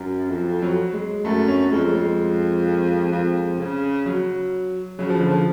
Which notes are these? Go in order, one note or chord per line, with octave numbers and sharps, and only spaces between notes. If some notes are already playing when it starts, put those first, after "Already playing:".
Already playing: F#2
F2
F#3
G#3
F#2 A3
C#4
F2 G#3
G#3
F2
C#3
F#3
C#3 F#3
F3
D3
F3